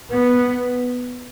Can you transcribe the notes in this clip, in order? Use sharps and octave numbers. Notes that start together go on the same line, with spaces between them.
B3